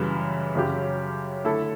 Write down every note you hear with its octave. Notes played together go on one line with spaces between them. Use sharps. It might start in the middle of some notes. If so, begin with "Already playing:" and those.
Already playing: F#2 C#3 E3 G3
F#2 C#3 F#3 C#4 G4
D3 A3 E4 A4